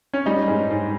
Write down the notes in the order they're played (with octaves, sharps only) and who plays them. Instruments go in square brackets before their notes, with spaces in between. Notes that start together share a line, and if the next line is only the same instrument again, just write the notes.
[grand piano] C#4
[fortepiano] G3 [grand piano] D#4
[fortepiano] G#2
G#2